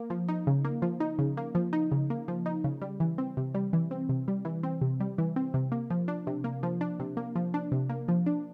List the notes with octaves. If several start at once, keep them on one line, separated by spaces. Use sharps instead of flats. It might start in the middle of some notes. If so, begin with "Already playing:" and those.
Already playing: A#3
F3
D#4
C#3
A#3
F3
D#4
C#3
A#3
F3
D#4
C#3
A#3
F3
D#4
C#3
G3
E3
C4
C3
G3
E3
C4
C3
G3
E3
C4
C3
G3
E3
C4
C3
A#3
F3
D4
C3
A#3
F3
D4
C3
A#3
F3
D4
C3
A#3
F3
D4